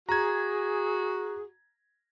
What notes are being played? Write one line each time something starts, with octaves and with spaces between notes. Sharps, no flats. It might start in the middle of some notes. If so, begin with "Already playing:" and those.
F#4 G#4 A#5 G#6